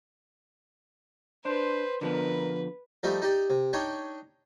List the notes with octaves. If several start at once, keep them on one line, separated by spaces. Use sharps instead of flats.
D4 B4 C5 C6
D3 F3 B3 A#4 B4
F3 G3 A3 D#4 G4
D#4 G4 D5
C3
D4 D#4 C#5 D#5 G5